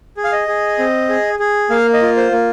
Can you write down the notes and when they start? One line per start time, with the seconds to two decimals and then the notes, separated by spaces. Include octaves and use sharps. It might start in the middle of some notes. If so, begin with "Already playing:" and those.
0.17 G#4
0.24 F5
0.32 D#5
0.48 G#4
0.79 C4
1.09 G#4
1.39 G#4
1.70 A#3 F5
1.94 D#5
2.02 F4
2.17 C5
2.32 A#3